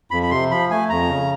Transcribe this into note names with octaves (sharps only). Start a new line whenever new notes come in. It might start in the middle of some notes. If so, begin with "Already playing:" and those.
F2 B5
B5
C3 C6
F3 B5
A3 G#5
F2 A#5
C#3